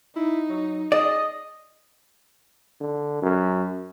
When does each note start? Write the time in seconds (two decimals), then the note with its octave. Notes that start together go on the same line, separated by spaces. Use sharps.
0.16 D#4 E4
0.49 F#3
0.92 G#4 D5 D#5
2.81 D3
3.22 F#2